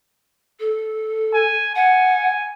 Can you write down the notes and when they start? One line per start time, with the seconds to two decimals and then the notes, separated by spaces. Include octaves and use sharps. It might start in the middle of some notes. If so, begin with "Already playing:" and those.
0.60 A4
1.33 G#5
1.76 F#5 G#5